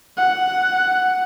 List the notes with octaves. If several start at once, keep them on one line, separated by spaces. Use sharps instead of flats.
F#5